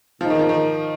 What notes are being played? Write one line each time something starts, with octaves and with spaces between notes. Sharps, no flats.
A#2 F3 G#3 D#4
D#3
F3
D#3